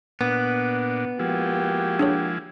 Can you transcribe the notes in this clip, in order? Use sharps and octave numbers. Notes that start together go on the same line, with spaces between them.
A#2 B3 D4
F3 G#3 A#3 E4 F#4 G4
D4 G#4 C#5